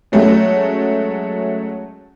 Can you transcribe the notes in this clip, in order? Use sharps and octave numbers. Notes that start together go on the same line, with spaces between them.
F#3 G#3 A3 C#4